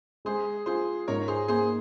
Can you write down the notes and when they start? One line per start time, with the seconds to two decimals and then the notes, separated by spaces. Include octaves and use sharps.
0.25 G#3 G#4 C5
0.66 F4 G#4 C5
1.08 G#2 A#4 C#5
1.28 G#4 C5
1.48 A#3 G#4 C5